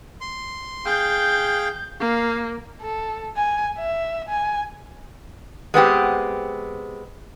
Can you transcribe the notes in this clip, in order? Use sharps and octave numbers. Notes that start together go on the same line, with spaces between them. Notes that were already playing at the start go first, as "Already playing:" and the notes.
C6
G#4 F5 G5 G6
A#3 F5
A4
G#5
E5
G#5
G#3 B3 C4 G4